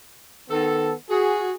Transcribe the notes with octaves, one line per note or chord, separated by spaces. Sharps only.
D#3 B3 A4
F#4 G#4